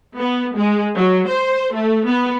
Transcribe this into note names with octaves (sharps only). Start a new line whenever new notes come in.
B3
G#3
F#3
C5
A3
B3